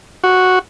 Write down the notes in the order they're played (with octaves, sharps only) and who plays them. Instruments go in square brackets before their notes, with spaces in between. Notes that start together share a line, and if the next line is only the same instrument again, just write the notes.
[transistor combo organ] F#4